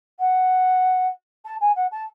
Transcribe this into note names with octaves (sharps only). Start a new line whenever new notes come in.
F#5
A5
G#5
F#5
A5